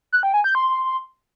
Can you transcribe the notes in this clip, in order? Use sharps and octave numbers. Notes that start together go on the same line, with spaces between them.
F#6
G5
G#5
G6
C6